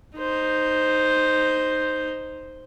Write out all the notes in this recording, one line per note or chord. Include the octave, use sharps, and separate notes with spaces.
D#4 C5